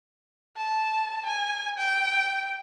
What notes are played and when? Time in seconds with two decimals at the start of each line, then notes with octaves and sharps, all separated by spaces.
0.57 A5
1.26 G#5
1.78 G5